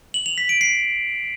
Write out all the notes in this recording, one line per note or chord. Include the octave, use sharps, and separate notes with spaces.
F#7
F7
B6
D7
C7